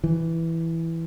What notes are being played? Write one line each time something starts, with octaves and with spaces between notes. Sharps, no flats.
E3